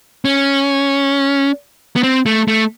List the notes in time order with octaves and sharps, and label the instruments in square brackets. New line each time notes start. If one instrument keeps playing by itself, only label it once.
[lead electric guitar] C#4
B3
C4
A3
A3